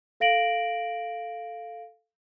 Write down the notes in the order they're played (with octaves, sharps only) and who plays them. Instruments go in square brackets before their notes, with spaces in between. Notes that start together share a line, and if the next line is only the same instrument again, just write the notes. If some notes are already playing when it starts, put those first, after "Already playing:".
[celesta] A4 F5 A#6 D7 F#7